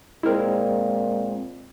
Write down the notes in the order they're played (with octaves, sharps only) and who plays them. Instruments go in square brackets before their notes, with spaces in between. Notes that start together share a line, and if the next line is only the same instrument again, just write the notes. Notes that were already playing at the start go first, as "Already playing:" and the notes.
[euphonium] A#2 [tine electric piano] G#3 C4 [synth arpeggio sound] E4 A#4